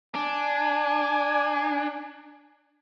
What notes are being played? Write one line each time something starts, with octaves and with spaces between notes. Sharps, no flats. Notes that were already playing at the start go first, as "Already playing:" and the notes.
D4 G#5